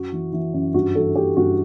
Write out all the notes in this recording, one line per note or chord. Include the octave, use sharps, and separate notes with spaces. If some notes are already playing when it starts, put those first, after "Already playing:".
Already playing: F#2 F#4
E3
E3
F#2
G2 F#4
E3 A4
E3 G4
G2 F#4